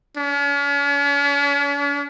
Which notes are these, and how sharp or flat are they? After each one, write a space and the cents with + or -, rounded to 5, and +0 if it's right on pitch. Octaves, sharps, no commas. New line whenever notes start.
C#4 +45